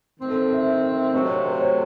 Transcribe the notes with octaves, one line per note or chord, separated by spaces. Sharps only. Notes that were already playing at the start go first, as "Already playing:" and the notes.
D#3 A3 C4
A4
E5
E5
E5
C3 F#3 A3 D#5
C#5
C5
C#5